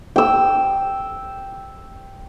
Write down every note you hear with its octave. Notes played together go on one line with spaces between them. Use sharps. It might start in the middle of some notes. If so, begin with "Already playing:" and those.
G5 E6